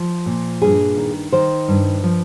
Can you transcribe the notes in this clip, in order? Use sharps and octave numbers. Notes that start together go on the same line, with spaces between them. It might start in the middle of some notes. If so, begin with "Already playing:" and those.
Already playing: F3
A#2
G2 G#4
D#3
D#3 C5
G2
F3